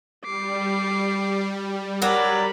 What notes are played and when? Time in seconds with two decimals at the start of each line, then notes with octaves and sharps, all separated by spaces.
0.25 G3 D6 C7
2.02 F#3 D4 A#4 B5